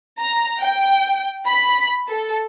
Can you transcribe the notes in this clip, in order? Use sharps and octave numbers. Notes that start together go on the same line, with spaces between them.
A#5
G5
B5
A4